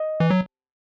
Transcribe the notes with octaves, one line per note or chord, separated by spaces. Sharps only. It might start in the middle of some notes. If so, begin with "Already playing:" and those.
Already playing: D#5
E3
F#3